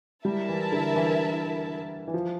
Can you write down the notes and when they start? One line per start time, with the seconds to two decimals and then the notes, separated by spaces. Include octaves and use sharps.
0.24 G3 E4 A#4 E5 A5
0.49 E3
0.72 D3
0.96 E3
2.08 E3
2.14 F3